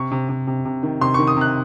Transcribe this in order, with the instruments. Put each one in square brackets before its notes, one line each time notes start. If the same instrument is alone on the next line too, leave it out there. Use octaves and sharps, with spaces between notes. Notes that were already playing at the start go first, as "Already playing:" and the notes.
Already playing: [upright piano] C3 C#6
C3
C3
C3
C3
D#3
C3 C6
C#6
D#3
D#6
C3 F#6